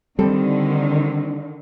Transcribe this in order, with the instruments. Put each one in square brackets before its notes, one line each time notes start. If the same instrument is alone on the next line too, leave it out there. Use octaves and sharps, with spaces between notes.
[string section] D3 D#3 [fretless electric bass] G3 [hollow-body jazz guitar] C4 A4